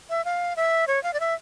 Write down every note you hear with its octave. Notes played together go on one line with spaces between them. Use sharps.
E5
F5
E5
C#5
F5
D5
E5